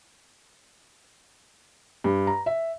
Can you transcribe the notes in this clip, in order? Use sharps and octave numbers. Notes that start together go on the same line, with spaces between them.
G2
A#5
E5